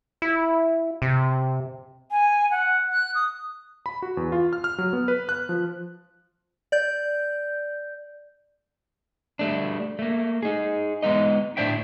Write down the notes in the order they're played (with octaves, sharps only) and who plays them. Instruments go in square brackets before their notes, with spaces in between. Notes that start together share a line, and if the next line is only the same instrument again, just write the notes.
[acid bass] E4
C3
[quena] G#5
F#5
F#6
D#6
[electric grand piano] B5
F#4
E2
F4
F6
F6
F#3
B3
B4
F#6
F3
[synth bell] D5 G6
[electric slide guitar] G3 A3 D4
A3 A#3
D#4 G#4
G#3 B3 D#4 D#5
A2 D4 C5 E5 G5